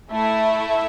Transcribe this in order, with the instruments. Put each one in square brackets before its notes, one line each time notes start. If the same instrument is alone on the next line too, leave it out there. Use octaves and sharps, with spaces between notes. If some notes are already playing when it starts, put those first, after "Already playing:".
[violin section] A3 E4 A4 E5